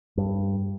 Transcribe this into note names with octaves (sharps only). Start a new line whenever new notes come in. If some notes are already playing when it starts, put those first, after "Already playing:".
G2